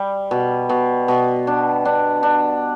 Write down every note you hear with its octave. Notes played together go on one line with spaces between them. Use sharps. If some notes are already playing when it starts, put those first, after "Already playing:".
Already playing: G3
B2
B2
B2
D4
D4
D4